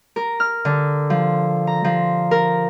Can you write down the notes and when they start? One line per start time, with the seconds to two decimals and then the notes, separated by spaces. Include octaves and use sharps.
0.16 A#4
0.40 F6
0.65 D3
1.10 F3
1.67 A#5
1.85 F3
2.31 A#4